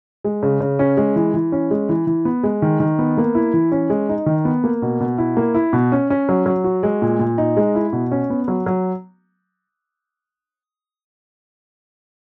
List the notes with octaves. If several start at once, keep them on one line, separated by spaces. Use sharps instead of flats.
G#3
C#3
C#3
C#4
G#3
E3
E3
C#4
G#3
E3
E3
B3
G#3
D#3
D#3
B3
A#3
E4
E3
C#4
G#3
D#4
D#3
B3
A#3
B2
B2
E4
A#3
E4
B2
C#4
C#4
F#3
F#3
F#4
G#3
A#2
A#2
D#4
G#3
E4
B2
C#4
B3
F#3
F#3